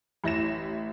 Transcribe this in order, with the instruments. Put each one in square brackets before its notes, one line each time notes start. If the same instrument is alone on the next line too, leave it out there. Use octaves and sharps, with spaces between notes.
[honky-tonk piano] A1 E4 A#6 E7